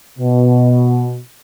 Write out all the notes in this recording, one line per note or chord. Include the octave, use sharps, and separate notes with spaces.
B2